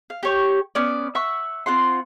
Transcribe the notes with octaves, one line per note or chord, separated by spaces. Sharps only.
F5
G4 C#5 C#6
B3 C#4 D5
E5 F#5 C#6 E6
C4 F4 F#5 C6